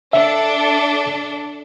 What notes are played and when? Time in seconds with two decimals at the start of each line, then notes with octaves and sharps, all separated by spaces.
0.13 D4 A4 E5